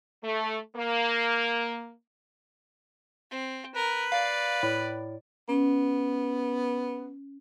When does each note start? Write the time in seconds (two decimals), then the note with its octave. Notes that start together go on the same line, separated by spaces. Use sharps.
0.23 A3
0.77 A#3
3.31 C4
3.75 A#4 B4
4.12 D5 F5
4.63 A2
5.49 B3 C#4